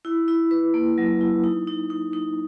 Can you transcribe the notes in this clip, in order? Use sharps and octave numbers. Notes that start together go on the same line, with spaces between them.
E4
E4
B4
A#3
F#3
E4
D#4
D#4
D#4
D#4